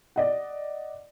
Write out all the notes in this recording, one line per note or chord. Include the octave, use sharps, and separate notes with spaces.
D5 D#5 F#5